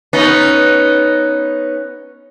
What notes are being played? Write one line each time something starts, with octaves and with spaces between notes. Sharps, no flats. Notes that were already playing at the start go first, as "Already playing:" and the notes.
B3 C#4 D#4